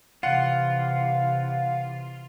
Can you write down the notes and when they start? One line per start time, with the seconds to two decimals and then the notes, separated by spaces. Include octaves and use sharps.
0.23 C3 E3 F4 F5 F#5